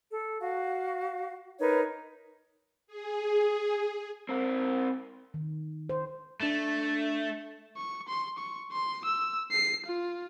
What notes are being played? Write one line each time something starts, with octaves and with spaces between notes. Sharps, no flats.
A4
F#4 F5
D#4 A#4 B4 C#5
G#4
C4 A#4
D#3
C5
A3 D4 E7
C#6
C6
C#6
C6
E6
C7
F4